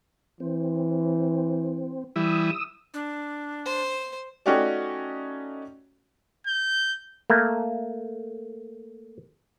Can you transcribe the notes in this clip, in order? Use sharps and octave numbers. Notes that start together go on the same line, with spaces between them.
E3 C4
E3 G3 E4 D#6 E6
D4
C5
A3 C#4 D#4 F#4 G4 D5
G6
A3 A#3